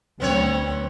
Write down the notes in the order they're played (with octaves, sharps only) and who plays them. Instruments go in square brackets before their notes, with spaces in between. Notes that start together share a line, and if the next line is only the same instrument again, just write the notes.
[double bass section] D2 F#3 [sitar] B3 C4 C#5